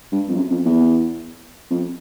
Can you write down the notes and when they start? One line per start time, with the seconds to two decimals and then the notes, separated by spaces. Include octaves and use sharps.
0.12 G2
0.29 F2
0.36 F#2
0.50 F2
0.65 E2
1.71 F2